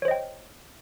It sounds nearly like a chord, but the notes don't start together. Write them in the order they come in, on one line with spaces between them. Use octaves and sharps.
C#5 C5 D#5 G5